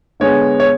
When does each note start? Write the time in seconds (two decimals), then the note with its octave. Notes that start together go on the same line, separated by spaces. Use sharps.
0.20 D3 G#3 B3 C#5
0.60 C#5